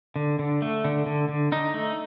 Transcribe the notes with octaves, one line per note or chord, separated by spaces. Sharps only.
D3
D3
A3
D3
D3
D3
D3 D#4
A3